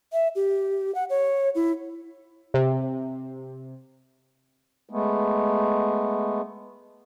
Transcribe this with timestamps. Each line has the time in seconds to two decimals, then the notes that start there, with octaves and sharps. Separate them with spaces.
0.13 E5
0.35 G4
0.95 F#5
1.10 C#5
1.55 E4
2.54 C3
4.89 G#3 A3 B3